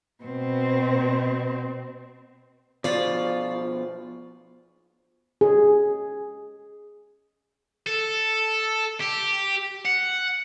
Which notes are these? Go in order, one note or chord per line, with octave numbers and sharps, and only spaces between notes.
B2 C4
B2 F3 F4 D5
G#4
A4
G4
F#5